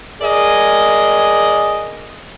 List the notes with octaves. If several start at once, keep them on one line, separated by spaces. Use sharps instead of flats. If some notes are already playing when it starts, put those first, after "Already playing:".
G#4 A#4 D5 D#5